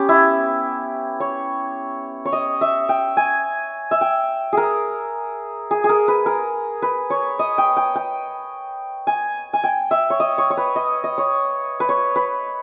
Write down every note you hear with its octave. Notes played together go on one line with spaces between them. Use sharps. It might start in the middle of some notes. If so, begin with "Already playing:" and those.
Already playing: B3 C#4 G4
E4
C#5
C#5
D#5
E5
G5
G#5
E5
G5
G#4 A#4
G#4
G#4
A#4
B4
A#4
B4
C#5
D#5
G5
G5
G5
G#5
G#5
G5
E5
C#5
D#5
C#5
C#5
B4
D#5
D#5
C#5
B4
C#5
B4